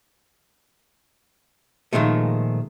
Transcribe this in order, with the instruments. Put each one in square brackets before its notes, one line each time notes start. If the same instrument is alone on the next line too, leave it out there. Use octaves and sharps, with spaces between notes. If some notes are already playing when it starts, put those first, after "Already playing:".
[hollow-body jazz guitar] A#2 D#3 F3 G#3 A3